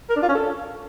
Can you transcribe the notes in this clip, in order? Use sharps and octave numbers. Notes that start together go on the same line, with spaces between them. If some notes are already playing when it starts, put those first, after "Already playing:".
A#4
D4
F4
C#4
A4